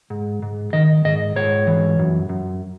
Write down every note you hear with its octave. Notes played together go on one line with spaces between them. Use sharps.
G#2
G#2
D#3 D#5
G#2 D#5
G#2 C#5
E3
F#2
F#2